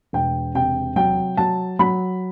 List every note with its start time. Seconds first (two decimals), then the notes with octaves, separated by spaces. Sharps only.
0.13 E1 G5
0.55 C3 G5
0.96 F#3 G5
1.37 F#3 A5
1.79 F#3 B5